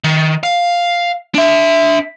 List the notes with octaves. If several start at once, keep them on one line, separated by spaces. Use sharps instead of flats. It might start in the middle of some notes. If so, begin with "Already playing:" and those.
D#3
F5
D4 E5